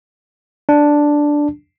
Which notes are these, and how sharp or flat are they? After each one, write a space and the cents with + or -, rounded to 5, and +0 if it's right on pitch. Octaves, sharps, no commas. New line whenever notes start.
D4 +0